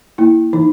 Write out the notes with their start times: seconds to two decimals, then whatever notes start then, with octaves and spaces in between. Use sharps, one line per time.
0.18 A#3 E4
0.53 E3 D#4